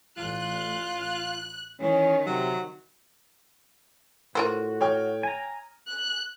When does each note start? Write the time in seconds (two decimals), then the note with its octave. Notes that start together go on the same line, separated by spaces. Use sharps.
0.17 A1 F4 F#6
1.02 F#6
1.81 D#3 E3 C#4
2.26 C3 F#3
4.35 A2 F4 F#4 A#4 C5
4.81 C#5 G5 F6
5.23 G#5 A#5
5.88 F#6